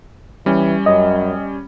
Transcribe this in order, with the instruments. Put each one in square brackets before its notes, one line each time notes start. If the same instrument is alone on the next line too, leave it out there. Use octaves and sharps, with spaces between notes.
[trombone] E3 [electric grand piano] G3 C#4
[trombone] F#2 [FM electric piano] D#5